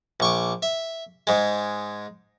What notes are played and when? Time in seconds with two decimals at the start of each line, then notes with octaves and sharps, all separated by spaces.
0.20 A#1 C#6 D6
0.62 E5
1.27 G#2 G#3